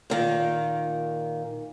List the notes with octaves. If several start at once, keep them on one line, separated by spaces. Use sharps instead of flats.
A#2 D#3